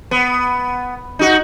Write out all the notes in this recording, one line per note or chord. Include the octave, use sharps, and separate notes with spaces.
B3
D#4 F#4